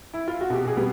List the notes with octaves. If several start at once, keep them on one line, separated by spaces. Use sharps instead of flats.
E4
F4
F#4
B2 G4
G#4
G3 B3